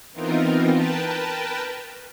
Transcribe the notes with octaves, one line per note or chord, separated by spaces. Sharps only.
E3 B3 C4 D#4 F4 A#4
A#4 B4 G5 A5